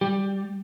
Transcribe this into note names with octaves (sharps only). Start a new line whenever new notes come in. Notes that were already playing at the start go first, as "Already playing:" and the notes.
G3 G4